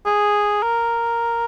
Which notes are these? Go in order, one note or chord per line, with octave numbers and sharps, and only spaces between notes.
G#4
A#4